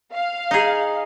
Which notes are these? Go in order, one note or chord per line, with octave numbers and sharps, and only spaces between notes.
F5
D#4 G#4